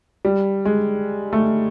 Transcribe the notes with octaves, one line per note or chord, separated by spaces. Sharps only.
G3
G#3
A3